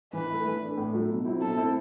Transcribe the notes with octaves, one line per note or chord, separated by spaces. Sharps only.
E3 B4
A3 E4
E3
A3 D4
A2
F#3 A3
B2
F#3 C4 E4
B2 A4
A3 C4 E4